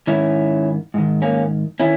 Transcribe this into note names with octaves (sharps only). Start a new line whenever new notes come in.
G#2 D#3 C#4 E4
G#2 D#3
A#3 C#4
D#3 C#4 E4